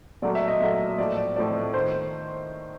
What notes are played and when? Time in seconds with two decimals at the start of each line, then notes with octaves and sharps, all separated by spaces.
0.22 A#2 F#3 A3 D5
0.35 E5
0.48 D#5
0.60 A#2 F#3 A3
0.98 A2 F3 A3 D5
1.18 D5
1.36 A2 F3 A3 D5
1.74 D#3 C5